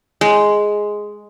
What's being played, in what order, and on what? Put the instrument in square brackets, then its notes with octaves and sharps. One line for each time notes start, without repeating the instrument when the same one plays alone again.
[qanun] G#3